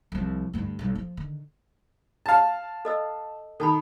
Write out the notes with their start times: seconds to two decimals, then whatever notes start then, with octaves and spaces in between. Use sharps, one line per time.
0.12 C2 F3
0.53 D2 G2
0.79 B1 G3
0.95 F3
1.17 D3 D#3
2.26 F5 A5
2.85 A4 D#5 E6
3.60 D#3 A4 A5 B5